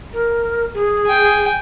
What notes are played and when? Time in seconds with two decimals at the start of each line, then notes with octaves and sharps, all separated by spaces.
0.13 A#4
0.74 G#4
1.07 G5 G#5